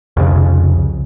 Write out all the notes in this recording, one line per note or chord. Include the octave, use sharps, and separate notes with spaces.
C2 F2 C#3